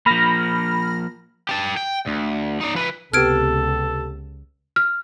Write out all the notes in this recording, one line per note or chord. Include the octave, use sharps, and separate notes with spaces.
F3 A#3 B5 F6 A#6
G4 A5
G5
D2
D#4 D5
F3 B4
C#2 C3 B3 G4 A4 F6 G#6 D7
F6